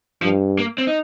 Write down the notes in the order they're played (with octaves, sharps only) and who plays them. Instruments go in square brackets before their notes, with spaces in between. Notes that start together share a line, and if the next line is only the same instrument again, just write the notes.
[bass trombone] G2 [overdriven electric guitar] F3
[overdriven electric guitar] A#3
C4
D#4